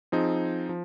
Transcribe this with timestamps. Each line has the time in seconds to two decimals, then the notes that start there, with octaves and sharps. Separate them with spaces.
0.12 F3 C4 D#4 G#4
0.69 F3